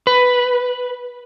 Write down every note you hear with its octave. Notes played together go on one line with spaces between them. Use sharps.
B4